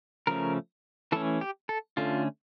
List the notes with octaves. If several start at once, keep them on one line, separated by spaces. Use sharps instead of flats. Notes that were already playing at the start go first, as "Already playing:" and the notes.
C#3 F3 A3 C#4 A#4
E3 A3 C#4 A4
G4
A4
D3 A3 C#4 F4